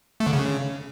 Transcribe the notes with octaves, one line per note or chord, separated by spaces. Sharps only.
A3
D3
C#3